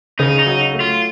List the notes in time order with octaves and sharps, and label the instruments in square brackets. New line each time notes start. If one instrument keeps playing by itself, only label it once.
[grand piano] C#3 [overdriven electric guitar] D#4
[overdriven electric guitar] D#4
[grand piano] F#3
A3
[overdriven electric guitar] F4